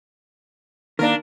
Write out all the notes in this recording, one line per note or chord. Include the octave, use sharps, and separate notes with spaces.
D#3 A#3 D4 A#4